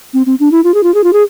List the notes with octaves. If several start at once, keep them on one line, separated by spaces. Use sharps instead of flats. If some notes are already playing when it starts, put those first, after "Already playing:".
C4
C4
D4
E4
F4
G#4
F4
G#4
F4
G#4